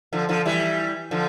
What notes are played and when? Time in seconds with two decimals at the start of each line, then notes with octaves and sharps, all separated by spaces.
0.13 D3 F3
0.29 D3 F3
0.45 E3 G3
1.11 D3 F3